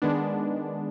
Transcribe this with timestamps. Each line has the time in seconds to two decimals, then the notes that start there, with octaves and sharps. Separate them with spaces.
0.02 D#3 G#3 B3 D4